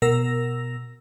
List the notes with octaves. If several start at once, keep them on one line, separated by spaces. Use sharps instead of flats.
B2 A#4 E6 A#6